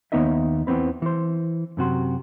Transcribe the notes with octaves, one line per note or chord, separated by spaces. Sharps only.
D#2 A3 B3 D#4 D#5 E5
E2 E3 B3 C4 B4
E3 C5
F#2 C3 F#4 C6